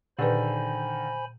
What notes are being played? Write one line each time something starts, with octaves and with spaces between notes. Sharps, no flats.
A#2 D3 D#3 B4 C5 G#5 B5